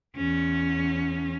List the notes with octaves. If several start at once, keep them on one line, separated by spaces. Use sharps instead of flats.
E2 C#4